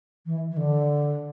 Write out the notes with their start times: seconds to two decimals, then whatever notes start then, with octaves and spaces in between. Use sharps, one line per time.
0.25 E3
0.51 E3
0.57 D3